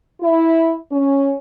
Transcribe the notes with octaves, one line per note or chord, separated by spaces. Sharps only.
E4
C#4